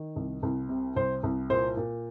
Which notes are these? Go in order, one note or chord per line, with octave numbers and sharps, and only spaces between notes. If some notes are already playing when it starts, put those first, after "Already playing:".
Already playing: D#3
C2
C2
C3
C2 C5
C2
A#2 C5
A#2